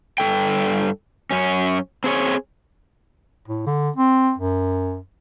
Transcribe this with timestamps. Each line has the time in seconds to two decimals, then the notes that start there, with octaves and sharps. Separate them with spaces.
0.18 G2 A#3 A4 G5
1.31 F#2 C#4
2.04 C4 G#4 C#5
3.48 A2
3.66 D3
3.96 C4
4.38 F#2